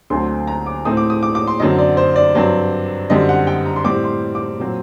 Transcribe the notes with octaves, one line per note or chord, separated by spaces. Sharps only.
D2 D3 F#3 A3 C4 C6
A#5
D6
A2 A3 C4 D#6
D6
D#6
D6
D6
C6
F#2 D3 F#3 C4 D#5
D5
C5
D5
G2 F#3 C4
F#2 D3 G3 C4 D#5
F#5
G5
A#5
C6
A2 G3 C4 D6
C6
D6
A#2 F#3 C4